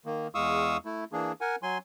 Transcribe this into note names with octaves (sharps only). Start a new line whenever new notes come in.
D#3 A#3
E2 G#3 F5 C#6 D#6 E6
A3 E4
E3 A#3 D4 G#4
A#4 F#5 G#5
F#3 G#5 C6